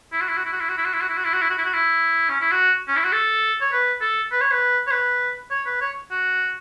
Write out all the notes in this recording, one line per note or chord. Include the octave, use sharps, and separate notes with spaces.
E4
F#4
E4
F#4
E4
F#4
E4
F#4
E4
F#4
E4
F#4
E4
F#4
E4
F#4
E4
F#4
E4
F#4
E4
C#4
E4
F#4
C#4
E4
F#4
A4
C#5
B4
A4
B4
C#5
B4
C#5
B4
C#5
B4
C#5
F#4